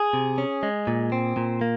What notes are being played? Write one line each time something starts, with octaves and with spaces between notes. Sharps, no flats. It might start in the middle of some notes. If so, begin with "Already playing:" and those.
Already playing: G#4
C3
C#4
G#3
A#2
C4
A#2
A#3